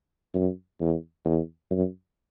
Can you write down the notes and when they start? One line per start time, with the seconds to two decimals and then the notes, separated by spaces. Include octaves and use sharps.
0.35 F#2
0.81 E2
1.25 E2
1.71 F#2